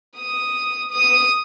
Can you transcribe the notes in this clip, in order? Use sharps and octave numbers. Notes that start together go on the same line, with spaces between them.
D#6
D#6